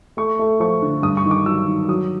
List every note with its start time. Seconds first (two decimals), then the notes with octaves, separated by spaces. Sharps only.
0.17 A3 C#6
0.39 A3
0.60 F3 C#6
0.82 D3
1.03 G2 D#6
1.17 C#6
1.25 D#3
1.31 D6
1.46 F#3 E6
1.67 D#3
1.88 F#3 D#6